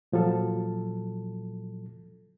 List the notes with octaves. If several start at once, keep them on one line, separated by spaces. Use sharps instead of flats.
A#2 F3 F#3 A4